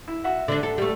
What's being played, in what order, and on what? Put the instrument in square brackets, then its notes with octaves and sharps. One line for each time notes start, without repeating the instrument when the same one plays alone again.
[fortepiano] E4
F#4 E5 F#5
[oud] D3 D4
A4
G3 A3